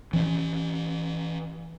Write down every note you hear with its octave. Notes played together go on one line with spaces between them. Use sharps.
E3 C#4